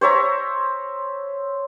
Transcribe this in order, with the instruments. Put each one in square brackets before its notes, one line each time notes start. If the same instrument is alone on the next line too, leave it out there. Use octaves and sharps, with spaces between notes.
[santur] C5 C#5 E5 A#5